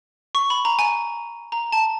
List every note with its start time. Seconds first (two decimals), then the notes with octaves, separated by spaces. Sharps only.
0.35 C#6
0.50 B5
0.65 A#5
0.79 G#5
1.52 A#5
1.72 A5